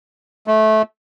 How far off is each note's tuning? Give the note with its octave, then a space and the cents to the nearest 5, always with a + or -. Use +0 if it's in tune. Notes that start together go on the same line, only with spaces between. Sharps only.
A3 -20